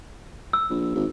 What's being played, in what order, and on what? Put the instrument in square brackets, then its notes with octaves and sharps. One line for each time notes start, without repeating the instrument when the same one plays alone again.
[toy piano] E6
[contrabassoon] A#1
G#1